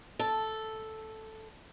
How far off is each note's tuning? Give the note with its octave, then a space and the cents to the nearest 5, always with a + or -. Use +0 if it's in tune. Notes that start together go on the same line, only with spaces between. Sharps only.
A4 -5